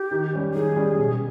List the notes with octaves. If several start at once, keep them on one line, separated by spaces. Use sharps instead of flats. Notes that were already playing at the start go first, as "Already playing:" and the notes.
Already playing: G4
D#3
G3 C#4 G4
D#3 G#4
G3 C#4 G4
B2